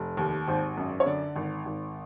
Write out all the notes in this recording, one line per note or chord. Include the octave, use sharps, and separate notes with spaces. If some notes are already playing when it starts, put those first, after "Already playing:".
Already playing: F1
D#2
G#1 C5
F#2
C#5
D3 D5
G#1
G#1